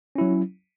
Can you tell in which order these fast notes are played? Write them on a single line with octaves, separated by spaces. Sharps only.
C#4 E4 F#3